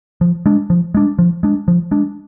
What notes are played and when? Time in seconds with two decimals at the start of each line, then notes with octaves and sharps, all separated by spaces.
0.21 F3
0.46 G#3 D4
0.70 F3
0.94 G#3 D4
1.19 F3
1.43 G#3 D4
1.68 F3
1.91 G#3 D4